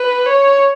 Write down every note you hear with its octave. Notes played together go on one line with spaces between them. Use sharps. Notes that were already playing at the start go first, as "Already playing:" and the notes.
Already playing: B4
C#5